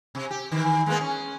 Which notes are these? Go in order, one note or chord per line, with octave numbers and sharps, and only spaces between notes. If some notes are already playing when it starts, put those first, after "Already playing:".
C3
G4
D#3 E3
G#3 A#3 B3
C#4